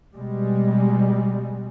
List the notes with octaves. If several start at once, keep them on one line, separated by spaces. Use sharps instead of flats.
B2 G3 G#3